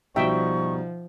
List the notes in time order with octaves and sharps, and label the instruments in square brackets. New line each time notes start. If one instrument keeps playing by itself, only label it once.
[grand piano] B2 G3 D#4 [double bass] F3 [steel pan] E5 G5 [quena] C#6